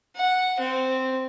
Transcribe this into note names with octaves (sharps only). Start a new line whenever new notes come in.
F#5
C4